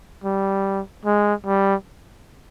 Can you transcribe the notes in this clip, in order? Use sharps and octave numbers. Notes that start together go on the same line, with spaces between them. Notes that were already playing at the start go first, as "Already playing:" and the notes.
G3
G#3
G3